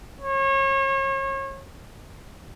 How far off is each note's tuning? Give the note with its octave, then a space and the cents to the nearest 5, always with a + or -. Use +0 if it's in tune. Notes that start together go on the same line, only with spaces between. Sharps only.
C#5 -35